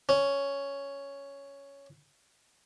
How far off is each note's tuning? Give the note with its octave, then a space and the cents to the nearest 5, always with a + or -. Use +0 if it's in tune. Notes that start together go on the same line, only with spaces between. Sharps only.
C#4 +5